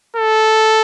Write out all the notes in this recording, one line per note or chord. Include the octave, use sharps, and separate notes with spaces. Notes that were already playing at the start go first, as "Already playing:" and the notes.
A4